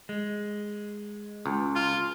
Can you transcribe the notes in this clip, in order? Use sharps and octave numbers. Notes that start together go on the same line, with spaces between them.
G#3
C#2
F4